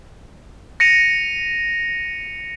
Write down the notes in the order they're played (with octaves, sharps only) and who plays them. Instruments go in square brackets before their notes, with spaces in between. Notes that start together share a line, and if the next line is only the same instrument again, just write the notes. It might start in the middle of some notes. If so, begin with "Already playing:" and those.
[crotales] A#6 C#7 D#7 F7